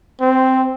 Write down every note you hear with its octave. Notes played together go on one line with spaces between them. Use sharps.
C4